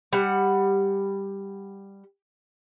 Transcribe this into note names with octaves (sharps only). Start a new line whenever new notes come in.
G3 F#5